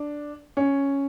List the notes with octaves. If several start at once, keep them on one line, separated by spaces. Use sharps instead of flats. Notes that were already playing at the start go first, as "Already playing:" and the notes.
Already playing: D4
C#4